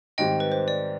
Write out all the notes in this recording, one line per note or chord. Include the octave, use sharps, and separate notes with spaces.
G#2 D#3 G3 C4 G4 D#5 G5
B4
C5
D5